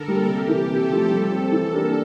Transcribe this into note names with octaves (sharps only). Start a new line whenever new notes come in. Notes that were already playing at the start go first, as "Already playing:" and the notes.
Already playing: D3 A4 A#4
G3 A#3
C3 G4
E3 A#3
C3 A4
F3 A3 E4
G3
C4 G4
E3 A4
A#3 D4 G4 A#4